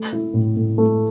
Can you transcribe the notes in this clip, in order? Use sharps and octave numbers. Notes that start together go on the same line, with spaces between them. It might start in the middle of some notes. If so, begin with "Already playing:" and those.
Already playing: A3
E4
A2
A2
A3